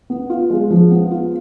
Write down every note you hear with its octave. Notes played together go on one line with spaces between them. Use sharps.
B3
F4
G#3
F3
B3
F4